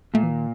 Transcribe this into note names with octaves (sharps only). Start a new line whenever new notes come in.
A#2 A3
E3
D#3